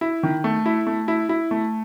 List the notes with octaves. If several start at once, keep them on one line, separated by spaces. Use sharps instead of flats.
E4
D#3
A3
E4
A3
E4
E4
A3